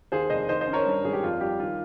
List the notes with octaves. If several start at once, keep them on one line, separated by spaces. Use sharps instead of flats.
D#2 G#4 C5
F1 C5 D#5
D#3 C5 D#5
C5 D#5
C#4
A#4 C#5
G2
G#1 G#4
G4
F2 F4
G3 G4
D#3 F4